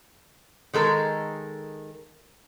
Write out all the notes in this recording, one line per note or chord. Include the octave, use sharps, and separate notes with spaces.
D#3 G#3 A4 A#4